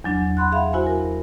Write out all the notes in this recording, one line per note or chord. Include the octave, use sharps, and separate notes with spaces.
E2 F#3 D4
F#5 B5 C6 F#6
G#4 E5 F5 B5
E4 F#4 C5 G#5 B5
A#4